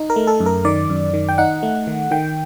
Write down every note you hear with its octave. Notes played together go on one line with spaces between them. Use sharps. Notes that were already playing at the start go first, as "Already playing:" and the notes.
Already playing: D#4
A#4
A3
A4
F#2
A#4
D#3 D5
F#2
D#3
G5
D#4 F#5
A3
D#3
D#3 G5